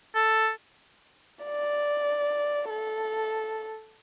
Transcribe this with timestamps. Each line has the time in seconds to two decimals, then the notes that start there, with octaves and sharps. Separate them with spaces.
0.15 A4
1.45 D5
2.70 A4